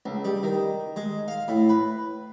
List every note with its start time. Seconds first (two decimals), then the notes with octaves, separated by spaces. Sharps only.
0.06 C#2
0.24 G3
0.43 D#3
0.96 G#3
1.28 F5
1.48 A2
1.69 B4